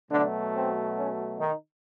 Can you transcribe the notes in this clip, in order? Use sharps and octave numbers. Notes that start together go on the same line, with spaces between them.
B2 D3 F#3 A3 D4
C4
C#4
D#3 D#4